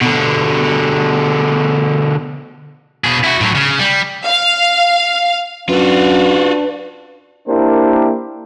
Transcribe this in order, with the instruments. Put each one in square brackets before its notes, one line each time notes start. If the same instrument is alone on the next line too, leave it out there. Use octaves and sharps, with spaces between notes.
[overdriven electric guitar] B2 D3
[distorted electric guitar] B2 G#4
E4 F#4
A2 F#3
C#3
G3
[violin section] F5
[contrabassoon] F#2 [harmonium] D4 [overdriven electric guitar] F4 F#4 [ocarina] B4
[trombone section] A#3 D4 E4 G4 A#4 C5